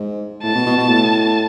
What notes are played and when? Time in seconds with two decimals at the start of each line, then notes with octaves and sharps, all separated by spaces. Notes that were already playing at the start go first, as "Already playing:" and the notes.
Already playing: G#2
0.43 A2 A5
0.55 B2
0.66 B2
0.78 B2
0.89 A2